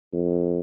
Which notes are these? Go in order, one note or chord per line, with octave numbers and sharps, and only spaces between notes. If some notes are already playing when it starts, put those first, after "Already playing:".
F2